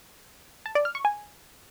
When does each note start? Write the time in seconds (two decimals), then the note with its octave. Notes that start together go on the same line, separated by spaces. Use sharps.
0.66 A5
0.75 D5
0.85 F6
0.95 C#6
1.05 G#5